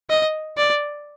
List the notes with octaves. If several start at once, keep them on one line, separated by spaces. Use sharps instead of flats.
D#5
D5